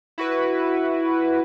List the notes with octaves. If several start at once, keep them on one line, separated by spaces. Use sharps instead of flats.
E4 F#4 B4